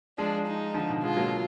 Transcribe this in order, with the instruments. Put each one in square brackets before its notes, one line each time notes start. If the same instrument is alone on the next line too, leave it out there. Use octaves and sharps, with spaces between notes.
[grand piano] F3 G#3 [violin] D4
[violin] D#4
[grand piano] D3 F3
B2 D#3
[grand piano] F3 G#3 [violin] F4
[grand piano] F#3 A#3